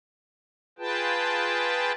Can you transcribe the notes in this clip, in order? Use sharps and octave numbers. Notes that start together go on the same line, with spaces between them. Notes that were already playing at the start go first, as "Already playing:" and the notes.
F4 G#4 B4 G5 A5